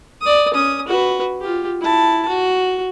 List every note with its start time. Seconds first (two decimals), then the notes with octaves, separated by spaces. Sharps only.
0.22 D5 D#6
0.54 C#4 D#6
0.88 F#4 B4
1.41 F4 G4
1.81 E4 A5
2.29 F#4